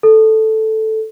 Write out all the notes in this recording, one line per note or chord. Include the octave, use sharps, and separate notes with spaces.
A4